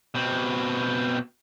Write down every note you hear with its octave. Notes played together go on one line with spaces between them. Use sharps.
B2 C4